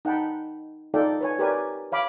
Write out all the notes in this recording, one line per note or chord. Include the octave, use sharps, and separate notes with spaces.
D#4 F#5 G5 A5 B5
D#4 F4 A4 D5 F5 G5
B4 C#5 G#5
G4 A#4 B4 D5 G#5
C#5 F5 B5 D6